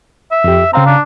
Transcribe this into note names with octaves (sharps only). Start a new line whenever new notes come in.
E5
F2 G4
C#3 C4 F5 A#5
D4